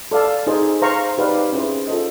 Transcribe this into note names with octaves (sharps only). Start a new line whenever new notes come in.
A4 D5 F5 A5
D#4 G#4 C5
C5 F5 A#5 C#6
D#4 G4 B4 D5 F5
C#4 E4 G#4 C5
F4 A4 C5 D#5